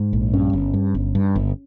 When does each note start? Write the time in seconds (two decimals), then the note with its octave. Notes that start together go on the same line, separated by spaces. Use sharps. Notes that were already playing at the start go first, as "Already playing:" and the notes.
Already playing: G#2
0.13 A#1
0.33 G2 C#4
0.53 G1
0.74 G2
0.95 G1
1.15 G2
1.36 G1